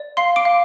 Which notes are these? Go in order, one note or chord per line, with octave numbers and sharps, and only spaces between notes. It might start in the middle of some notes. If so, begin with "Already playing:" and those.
Already playing: D5
F5 C6 C7
D6 D7
F5